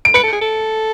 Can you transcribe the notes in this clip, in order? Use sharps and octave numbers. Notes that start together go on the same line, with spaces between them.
D7
B4 C#7
A4
G#4
A4